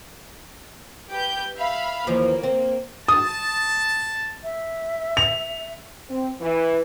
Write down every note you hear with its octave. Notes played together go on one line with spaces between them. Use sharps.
G4 B4 G6
E5 F5 B5
D#2 E3 F3 A#3
C4
A5 D#6
E5
F7
C4
E3